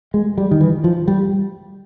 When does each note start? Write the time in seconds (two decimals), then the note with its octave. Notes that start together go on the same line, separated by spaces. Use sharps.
0.14 G#3
0.38 G3
0.51 D#3
0.61 E3
0.84 F3
1.08 G3